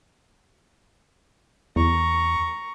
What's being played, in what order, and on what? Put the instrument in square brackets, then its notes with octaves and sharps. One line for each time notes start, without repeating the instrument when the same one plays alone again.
[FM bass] E2 [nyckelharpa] A#5 C#6